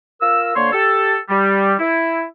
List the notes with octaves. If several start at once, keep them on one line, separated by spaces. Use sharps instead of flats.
F4 A#4 E6
D3 A#3 C5 C#5 C6
G4 A4
G3
E4